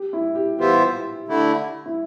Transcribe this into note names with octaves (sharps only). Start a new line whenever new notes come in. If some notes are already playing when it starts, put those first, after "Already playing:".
Already playing: G4
E4
G4
E3 B3 F4 G4 C5 E5
D3 A3 E4
E4